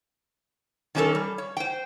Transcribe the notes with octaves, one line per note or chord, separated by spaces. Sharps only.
D#3 G3 C#4 D#4 A4 A#4
G3
C#5
C5 G5